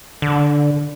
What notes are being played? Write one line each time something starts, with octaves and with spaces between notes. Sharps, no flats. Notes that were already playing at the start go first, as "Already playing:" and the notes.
D3